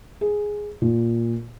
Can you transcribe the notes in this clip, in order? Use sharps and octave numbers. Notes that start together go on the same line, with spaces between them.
G#4
A#2